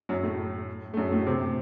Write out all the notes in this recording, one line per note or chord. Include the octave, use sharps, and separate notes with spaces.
F#2 F#3
A2 A3
A3
F#2 F#3
A2 A3
C3 C4